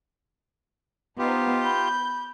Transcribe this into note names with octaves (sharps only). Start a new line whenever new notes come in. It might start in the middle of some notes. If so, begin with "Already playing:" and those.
B3 D#4 F4 G4 C5
B5 G6